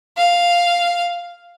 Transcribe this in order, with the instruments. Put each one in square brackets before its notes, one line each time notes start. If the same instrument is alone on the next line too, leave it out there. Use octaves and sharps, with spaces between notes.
[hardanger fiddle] F5